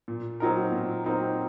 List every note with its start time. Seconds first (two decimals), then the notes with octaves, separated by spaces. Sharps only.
0.08 A#2
0.40 F#3 C4 D#4 A#4
0.72 A#2
1.04 F#3 C4 D#4 A#4